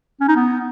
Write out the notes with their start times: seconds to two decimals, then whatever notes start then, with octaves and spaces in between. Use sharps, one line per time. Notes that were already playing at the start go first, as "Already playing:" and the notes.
0.21 C#4
0.28 D#4
0.36 B3